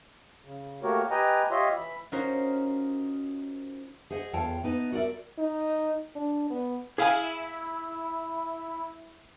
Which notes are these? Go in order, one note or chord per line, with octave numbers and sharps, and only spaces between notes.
C#3
A3 A#3 F#4 G4 A#4 C#5
G4 B4 D#5 G5 G#5 A#5
F4 G4 C#5 D#5 E5 C6
E3 E5 B5
C#4 D#4 F4 F#4 A#4 C5
G#4 C5 D#5 F#5
E2 F4 A4 C#5 G5 A5
B3 D#4 B4
F#4 A#4 D5 E5
D#4
D4
B3
E4 G#4 F5 G#5